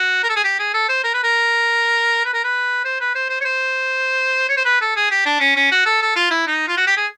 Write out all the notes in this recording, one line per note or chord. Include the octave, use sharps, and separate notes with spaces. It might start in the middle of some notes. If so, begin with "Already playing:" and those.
Already playing: F#4
A#4
A4
G#4
G4
G#4
A4
C5
A#4
B4
A#4
B4
A#4
B4
C5
B4
C5
C5
C#5
C5
C#5
C5
B4
A4
G#4
G4
D4
C#4
C#4
F#4
A4
A4
F4
E4
D#4
F4
F#4
G4
G#4